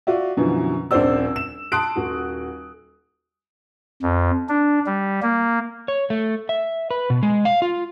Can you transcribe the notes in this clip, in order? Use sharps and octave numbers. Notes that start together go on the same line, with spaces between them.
F4 F#4 D5 E5
F#2 B2 D3 E3 F3
D#1 A#1 C4 C5 D5 E6
E7
A5 C6 D#6 F#6 D7
D#1 F#4
F2
D4
G3
A#3
C#5
A3
E5
B4
B2
G#3
F5
F4